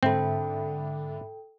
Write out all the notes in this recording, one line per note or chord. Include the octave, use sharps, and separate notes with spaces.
G#2 D3 C4 A4 E5 G5 B5